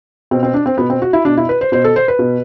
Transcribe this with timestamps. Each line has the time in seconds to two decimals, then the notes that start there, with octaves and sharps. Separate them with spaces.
0.31 B2 C4
0.43 C4
0.54 D4
0.66 C4
0.77 B2 B3
0.90 C4
1.02 F#4
1.13 E4
1.25 B2 D4
1.37 E4
1.49 B4
1.61 C5
1.72 B2 C5
1.84 A4
1.96 C5
2.08 B4
2.19 B2